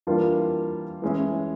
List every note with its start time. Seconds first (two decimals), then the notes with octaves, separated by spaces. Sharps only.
0.07 E3 G3 A#3 D4 F4
1.02 E3 G#3 C#4 E4